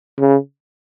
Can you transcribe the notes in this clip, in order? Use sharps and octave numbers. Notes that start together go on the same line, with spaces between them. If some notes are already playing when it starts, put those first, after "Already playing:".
C#3